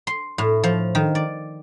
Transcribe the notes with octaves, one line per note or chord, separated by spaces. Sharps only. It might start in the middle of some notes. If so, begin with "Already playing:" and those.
C6
A2
F3
D#3
D5